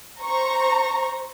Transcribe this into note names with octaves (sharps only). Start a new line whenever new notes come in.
C5 A#5 C#6